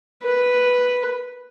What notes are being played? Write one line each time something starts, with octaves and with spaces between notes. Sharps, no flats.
B4